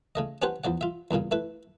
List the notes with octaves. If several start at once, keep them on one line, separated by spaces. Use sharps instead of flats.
C#3 A3 D#5
C#4 D4 G4 B4 C5 F#5
E2 F3 D5 F#5
F4 E5
E2 G2 A#2 C#3
A3 E4 B4